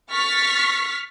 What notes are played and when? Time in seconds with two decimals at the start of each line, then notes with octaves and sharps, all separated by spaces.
0.12 C#6 F6 A6 B6